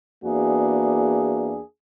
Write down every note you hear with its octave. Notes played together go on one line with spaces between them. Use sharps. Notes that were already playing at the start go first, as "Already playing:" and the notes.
E2 A#3 D4 F#4 G#4